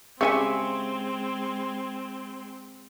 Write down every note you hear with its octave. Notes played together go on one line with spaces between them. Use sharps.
C#3 G#3 C4 C#4 G4 E5 G#5 C#6